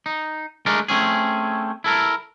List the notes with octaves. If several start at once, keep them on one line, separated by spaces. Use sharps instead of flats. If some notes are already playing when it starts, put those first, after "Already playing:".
D#4
G#3 A3 D4 A#4
A3 C4 C#4 G#4
E4 A4 A#4